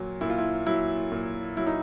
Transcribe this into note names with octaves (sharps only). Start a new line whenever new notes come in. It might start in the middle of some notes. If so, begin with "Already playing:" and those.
Already playing: A#2 F#3
A#2 E4
F4
E4
F#3 E4
A#2
F#3 E4
D#4